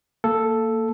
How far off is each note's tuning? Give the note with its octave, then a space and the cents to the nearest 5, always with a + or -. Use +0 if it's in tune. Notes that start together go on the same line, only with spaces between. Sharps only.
A#3 -25 A4 +0